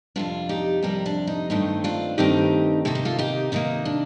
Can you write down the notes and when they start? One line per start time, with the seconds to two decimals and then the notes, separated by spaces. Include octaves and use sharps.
0.16 F2 C3 G3 D4 F4
0.49 D#4 G4
0.82 F2 C3 G3 G4 A#4
1.06 D4
1.27 D#4
1.50 G2 D#3 A3 C4 D#4
1.84 D4 F4
2.18 G2 D#3 A3 C4 D#4 G4
2.85 C3 D#3 A#3 A4
2.95 G4
3.05 F4 A4
3.18 D#4 G4
3.52 C3 D#3 A#3 D#4
3.85 D4